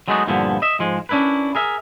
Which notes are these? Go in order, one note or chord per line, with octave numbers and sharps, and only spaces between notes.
F#3 G#3 A3 B3 D#4 F#4
G2 A#2 D3 F3 B3 E4
D#5 E5
G#2 F3 G#3
C#4 D4 E4 A#4 B4
G#4 A#4 E5